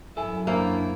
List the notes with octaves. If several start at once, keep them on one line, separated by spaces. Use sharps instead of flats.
F#2 E4 A4 G#5
A#3 D4 E4 C5 A#5